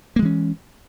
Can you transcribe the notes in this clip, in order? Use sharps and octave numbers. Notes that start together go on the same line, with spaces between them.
E3 G#3 A#3 C#4